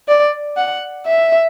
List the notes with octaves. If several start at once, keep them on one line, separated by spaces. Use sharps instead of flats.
D5
F#5
E5